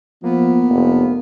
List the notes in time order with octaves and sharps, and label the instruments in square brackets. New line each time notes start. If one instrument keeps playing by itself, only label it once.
[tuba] F3 [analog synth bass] A#3 [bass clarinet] B3
[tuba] F1